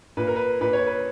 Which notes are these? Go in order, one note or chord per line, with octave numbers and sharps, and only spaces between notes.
A#2 B4
A#4
B4
A#2 B4
C#5
B4